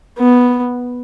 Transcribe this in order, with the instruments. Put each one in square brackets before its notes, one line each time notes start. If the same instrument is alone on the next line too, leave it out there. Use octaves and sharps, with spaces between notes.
[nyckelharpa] B3